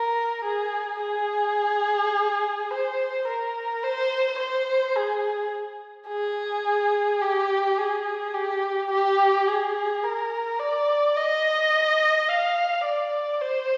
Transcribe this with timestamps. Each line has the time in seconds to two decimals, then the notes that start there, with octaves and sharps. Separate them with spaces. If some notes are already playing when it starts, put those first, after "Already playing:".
Already playing: A#4
0.45 G#4
1.01 G#4
2.71 C5
3.28 A#4
3.84 C5
4.39 C5
4.96 G#4
6.09 G#4
7.21 G4
7.78 G#4
8.34 G4
8.91 G4
9.47 G#4
10.04 A#4
10.59 D5
11.16 D#5
12.29 F5
12.85 D5
13.41 C5